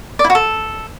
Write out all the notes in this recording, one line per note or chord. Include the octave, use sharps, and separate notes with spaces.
D5
E4
F#4
A4